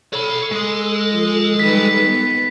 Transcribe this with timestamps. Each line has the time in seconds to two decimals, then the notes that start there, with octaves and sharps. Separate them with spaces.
0.13 A4 C#5 B5
0.52 G#3 G#4
1.11 F3
1.60 D#3 G3 B4 B6
2.06 B3